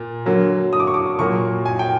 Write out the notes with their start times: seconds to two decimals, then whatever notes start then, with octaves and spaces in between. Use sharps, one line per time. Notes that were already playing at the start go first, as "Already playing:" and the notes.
Already playing: A#2
0.26 D3 F#3 A#3
0.73 D#6
0.80 D6
0.87 C#6
0.94 D6
1.19 A#2 F#3 A#3 C#6
1.66 G#5
1.79 G5